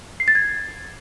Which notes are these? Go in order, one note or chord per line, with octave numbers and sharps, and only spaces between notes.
C7
A6
G#6